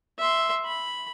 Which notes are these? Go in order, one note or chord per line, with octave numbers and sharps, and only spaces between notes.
E5 C6
B5